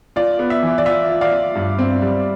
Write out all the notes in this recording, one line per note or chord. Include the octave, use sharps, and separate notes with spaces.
F4 D5
B3
E5
E3
D5
F4 E5
F4
D5 F5
F4
G2
C4
G3